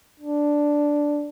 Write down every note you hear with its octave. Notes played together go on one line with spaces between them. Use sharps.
D4